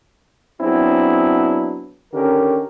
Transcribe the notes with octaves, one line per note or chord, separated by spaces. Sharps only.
F#3 B3 C4 D4 E4 G#4
D3 D#3 C#4 G4 A#4